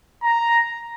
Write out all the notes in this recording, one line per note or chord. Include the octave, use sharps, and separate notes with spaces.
A#5